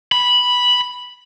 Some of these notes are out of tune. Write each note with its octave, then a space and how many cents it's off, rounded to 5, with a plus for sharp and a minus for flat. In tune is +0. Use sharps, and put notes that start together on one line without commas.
B5 -5